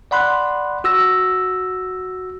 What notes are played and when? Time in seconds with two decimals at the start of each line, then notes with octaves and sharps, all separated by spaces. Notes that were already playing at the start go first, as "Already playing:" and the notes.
0.11 D5 F#5 B5 C6 F#6
0.84 F#4 E6 A#6